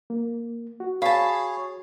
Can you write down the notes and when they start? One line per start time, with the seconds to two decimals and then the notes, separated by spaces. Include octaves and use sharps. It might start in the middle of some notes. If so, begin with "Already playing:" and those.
0.10 A#3
0.80 F#4
1.02 G#4 C#5 F5 A5 B5